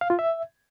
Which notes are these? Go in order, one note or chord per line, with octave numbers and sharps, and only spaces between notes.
F5
F4
E5